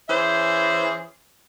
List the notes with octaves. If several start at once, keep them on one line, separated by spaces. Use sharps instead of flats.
E3 C#4 G#4 C5 E5